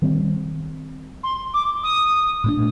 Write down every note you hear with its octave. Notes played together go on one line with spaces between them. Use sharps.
D#3 G3 C4
C6
D6
D#6
A#2 A3 D4